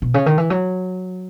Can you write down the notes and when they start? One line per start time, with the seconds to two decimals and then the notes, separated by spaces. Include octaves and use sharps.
0.02 B2
0.14 C#3
0.26 D#3
0.38 E3
0.50 F#3